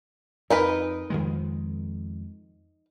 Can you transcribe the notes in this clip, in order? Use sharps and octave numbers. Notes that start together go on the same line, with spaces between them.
F2 D#4 A#4 B4
F2 D#3 G#3